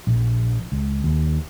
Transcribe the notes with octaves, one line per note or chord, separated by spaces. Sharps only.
A#1
C#2
D#2